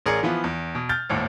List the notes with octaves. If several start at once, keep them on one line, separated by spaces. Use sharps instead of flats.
A1 G#4 A#4 D5 C#7
E3 F3 B3 F4
E2
B2
F6 G6 A6
G#1 D#2 A2